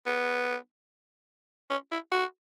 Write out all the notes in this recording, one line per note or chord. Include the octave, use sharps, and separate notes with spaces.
B3
C#4
E4
F#4